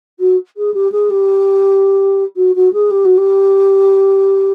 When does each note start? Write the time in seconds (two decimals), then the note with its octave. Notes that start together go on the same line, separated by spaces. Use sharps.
0.19 F#4
0.56 G#4
0.73 G4
0.91 G#4
1.09 G4
2.36 F#4
2.55 F#4
2.73 G#4
2.90 G4
3.04 F#4
3.17 G4